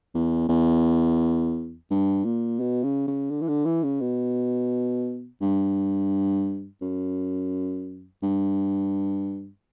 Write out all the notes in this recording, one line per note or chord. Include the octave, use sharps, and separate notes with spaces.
E2
E2
G2
A#2
B2
C#3
C#3
D3
E3
D3
E3
C#3
B2
G2
F#2
G2